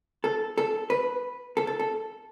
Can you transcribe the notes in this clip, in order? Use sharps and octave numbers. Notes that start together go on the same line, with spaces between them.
A4
A4
B4
A4
A4
A4